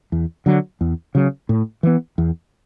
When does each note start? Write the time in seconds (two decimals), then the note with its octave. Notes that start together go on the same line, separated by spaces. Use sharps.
0.12 E2
0.46 D3 F#3
0.81 E2
1.15 C#3 F#3
1.49 A2
1.83 E3 B3
2.18 E2